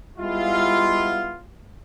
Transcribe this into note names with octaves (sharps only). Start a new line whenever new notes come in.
G3 G#3 B3 E4 F4